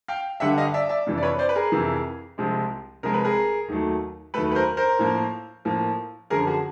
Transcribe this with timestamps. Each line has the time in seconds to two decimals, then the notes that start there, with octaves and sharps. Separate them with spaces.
0.08 F5 G5
0.40 G2 D3 G3 E5 F#5
0.58 D#5 F5
0.74 D5 E5
0.89 D5 E5
1.07 F2 C3 E3
1.18 D5
1.23 B4 C#5
1.39 C5 D5
1.49 B4
1.55 G#4 A#4
1.72 F2 C3 E3
2.38 C2 C3 F3 G#3
3.03 C2 C3 F3 G#3 A#4
3.14 B4
3.24 G#4 A#4
3.68 D#2 D#3 F#3 A3
4.34 D#2 D#3 F#3 A3 A4 B4
4.51 B4
4.55 A#4 C5
4.77 A#4 C5
4.99 A2 F3 A#3
5.65 A2 F3 A#3
6.30 F#2 D3 F3 G#4 A#4
6.47 F#4 G#4